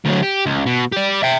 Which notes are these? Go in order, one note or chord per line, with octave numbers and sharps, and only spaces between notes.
D2 F#3
G4
C#2
B2
G4 D5
E5 G5